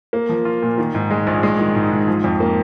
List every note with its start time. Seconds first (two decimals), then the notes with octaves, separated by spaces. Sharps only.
0.13 A#3
0.29 F3
0.45 F4
0.63 A#2
0.78 D#3
0.95 G#2
1.11 G#3
1.27 A#1
1.43 G#3
1.59 D#3
1.75 G#2
1.92 G#2
2.07 F3
2.24 F2
2.40 A#3